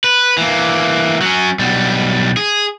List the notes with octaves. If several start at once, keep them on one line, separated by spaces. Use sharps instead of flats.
B4
E3 A#3
F#3 C#4
B1 G3
G#4